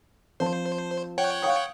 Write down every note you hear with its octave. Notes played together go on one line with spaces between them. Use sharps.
F3 C4 C5 A5
C#5 F#5 G5
F5 C#6 D#6